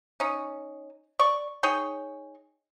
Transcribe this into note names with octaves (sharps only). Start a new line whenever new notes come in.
C#4 D#4
D5 C#6
D#4 G#4 C#5 G5